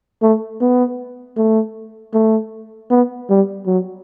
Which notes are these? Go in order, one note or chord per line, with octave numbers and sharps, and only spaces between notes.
A3
B3
A3
A3
B3
G3
F#3